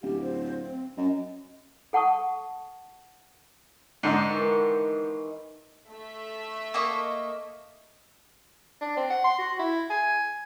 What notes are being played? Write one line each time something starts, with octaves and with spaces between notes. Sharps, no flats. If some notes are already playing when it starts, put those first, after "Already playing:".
D1 G4
C5
C4
F#2 D#5
A4 F#5 A5 C#6 D#6
G#2 D3 D#4
D#3 E3
A3 E5
A#3 D#5 C#6
D4
C4
F#5
C6
F#4
E4
G#5